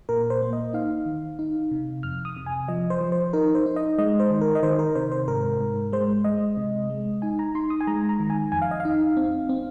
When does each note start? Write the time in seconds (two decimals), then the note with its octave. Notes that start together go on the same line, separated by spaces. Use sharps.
0.09 A#2 A#4
0.30 C5
0.42 A#3
0.53 D#5
0.73 D#4 F5
1.06 D#3
1.39 D#4
1.71 C3
2.03 F2 F6
2.25 D#6
2.37 C3
2.46 G#5
2.68 F3 D#5
2.90 C5
3.00 F3
3.12 C5
3.33 D#4 A#4
3.55 C5
3.66 D#4
3.76 D#5
3.98 G#3 D#5
4.20 C5
4.30 D#3
4.41 A#4
4.55 D#5
4.63 D#3 C5
4.79 A#4
4.95 C3 C5
5.12 C5
5.28 G#2 A#4
5.61 G#2
5.92 G#3 C5
6.24 G#3 D#5
6.57 C3
6.90 G#3
7.22 D#4 G#5
7.39 A#5
7.55 D#4 C6
7.70 D#6
7.81 G#5
7.87 G#3 A#5
8.09 A#5
8.20 D#3
8.30 G#5
8.52 F2 G#5
8.62 F5
8.71 D#5
8.80 F5
8.85 D#4
9.17 C4
9.49 C4